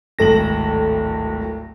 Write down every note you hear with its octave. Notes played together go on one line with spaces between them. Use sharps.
D1 G#1 A4 A#6 F#7